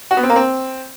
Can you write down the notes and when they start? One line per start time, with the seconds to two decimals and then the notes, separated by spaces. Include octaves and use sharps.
0.11 F#4
0.17 B3
0.23 C4
0.30 A#3
0.36 C4